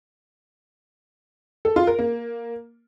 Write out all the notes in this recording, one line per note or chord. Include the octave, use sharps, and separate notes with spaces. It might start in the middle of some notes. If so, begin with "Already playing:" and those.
A4
F4
A#4
A#3